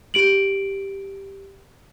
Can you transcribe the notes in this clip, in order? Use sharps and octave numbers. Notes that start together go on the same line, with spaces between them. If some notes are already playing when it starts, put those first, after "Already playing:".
G4 D7 F#7